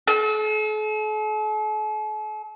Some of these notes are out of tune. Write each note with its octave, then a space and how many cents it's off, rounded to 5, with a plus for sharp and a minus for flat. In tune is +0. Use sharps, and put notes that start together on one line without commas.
A4 -45